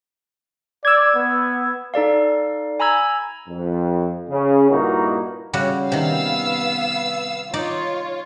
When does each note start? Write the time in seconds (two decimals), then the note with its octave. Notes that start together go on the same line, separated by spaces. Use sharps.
0.85 D5 E6 G#6
1.16 B3
1.94 D#4 A4 D5 F5
2.80 G#5 A#5 B5 E6 G#6
3.49 F2
4.30 C#3
4.70 G2 A#2 A#3 D#4 E4 F#4
5.53 C#3 G3 F#4
5.92 C3 D#3 B3 F5 E6
7.54 D#4 F4 C#5 D5